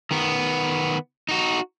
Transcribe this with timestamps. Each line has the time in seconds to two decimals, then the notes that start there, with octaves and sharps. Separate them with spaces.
0.11 D#3 B3
1.29 D#4 F#4